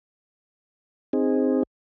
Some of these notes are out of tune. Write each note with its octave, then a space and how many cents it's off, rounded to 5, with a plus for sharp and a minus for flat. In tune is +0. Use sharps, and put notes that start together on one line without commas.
C4 +0 D#4 -5 G#4 -15